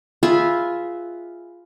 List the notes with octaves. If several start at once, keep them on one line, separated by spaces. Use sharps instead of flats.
F4 G#4 B4 E5